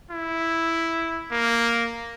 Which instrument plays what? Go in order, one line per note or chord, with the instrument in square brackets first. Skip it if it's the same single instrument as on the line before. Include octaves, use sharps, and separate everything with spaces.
[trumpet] E4
A#3